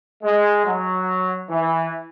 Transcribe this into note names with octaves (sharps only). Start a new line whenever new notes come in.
G#3
F#3
E3